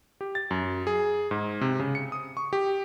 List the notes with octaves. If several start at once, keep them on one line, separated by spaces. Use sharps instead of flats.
G4
A6
F#2
G#4
G#2
C3
C#3
C#7
D#6
C#6
G4